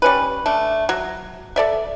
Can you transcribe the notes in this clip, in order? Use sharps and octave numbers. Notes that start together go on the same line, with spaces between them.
G3 C#4 B4
A3 D4
F#3
A4 D5 E5